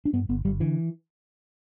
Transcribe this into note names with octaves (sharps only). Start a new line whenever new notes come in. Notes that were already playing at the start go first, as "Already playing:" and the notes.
D4
G2 B3
G1 B3
G1 G3
D3 E3